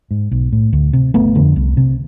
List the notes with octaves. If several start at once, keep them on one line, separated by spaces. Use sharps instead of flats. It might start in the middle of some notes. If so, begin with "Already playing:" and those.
G#2
B1
A2
D2
C3
G1 A3 B3
F2 D3
C2
C3